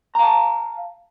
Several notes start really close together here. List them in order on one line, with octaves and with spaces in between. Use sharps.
A#5 F5 A5